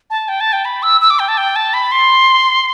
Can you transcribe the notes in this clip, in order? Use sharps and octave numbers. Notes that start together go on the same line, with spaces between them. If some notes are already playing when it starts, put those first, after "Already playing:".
A5
G5
A5
G5
B5
E6
E6
D6
G5
A5
G5
A5
B5
C6